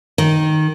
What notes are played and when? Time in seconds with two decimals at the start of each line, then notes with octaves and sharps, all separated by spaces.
0.18 D#3